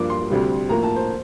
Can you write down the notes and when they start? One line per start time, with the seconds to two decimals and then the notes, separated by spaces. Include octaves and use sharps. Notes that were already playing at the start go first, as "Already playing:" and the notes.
Already playing: G2 F3 A#3 D6
0.10 C6
0.30 D2 C3 G3
0.69 A2 F3 A#3 A#5
0.83 A5
0.96 C5